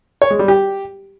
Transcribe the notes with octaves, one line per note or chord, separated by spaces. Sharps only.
C#5
G#3
G3
G4